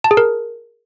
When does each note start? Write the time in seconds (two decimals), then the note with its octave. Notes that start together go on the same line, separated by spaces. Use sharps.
0.04 A5
0.11 G#4
0.17 A#4